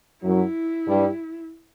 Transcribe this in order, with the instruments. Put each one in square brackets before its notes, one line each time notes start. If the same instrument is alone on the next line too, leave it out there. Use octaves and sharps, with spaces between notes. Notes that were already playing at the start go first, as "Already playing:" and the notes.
[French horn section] F#2 F#3 [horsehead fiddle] E4
[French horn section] G2 G3